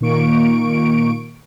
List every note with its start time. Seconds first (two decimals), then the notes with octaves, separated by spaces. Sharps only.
0.01 A#2 D#3 A#3 C#6 D7